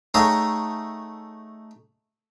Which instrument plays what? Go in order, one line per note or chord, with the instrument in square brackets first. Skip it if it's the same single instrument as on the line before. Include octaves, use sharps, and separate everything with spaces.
[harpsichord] A3 D#4 G#4 C#5 F#5 A#5